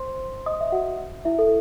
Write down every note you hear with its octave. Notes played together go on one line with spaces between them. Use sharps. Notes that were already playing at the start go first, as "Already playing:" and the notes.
Already playing: C5 C6
D#5 D#6
E5
F#4 F#5
E4 E5
A4